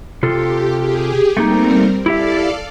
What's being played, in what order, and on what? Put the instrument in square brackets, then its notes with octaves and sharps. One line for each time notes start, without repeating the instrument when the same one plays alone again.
[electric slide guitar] C3 F4 A4 [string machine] G4
[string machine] G4 G#4
[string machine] G3 C4 A#4 [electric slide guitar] A3 A#3 D#4
[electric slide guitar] E4 G4 E5 [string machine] A4 D5 F5